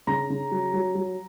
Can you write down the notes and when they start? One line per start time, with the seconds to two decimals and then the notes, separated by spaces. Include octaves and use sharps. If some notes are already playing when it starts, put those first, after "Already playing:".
0.07 C#3 A#5
0.30 C#3
0.52 F#3
0.74 F#3
0.95 F#3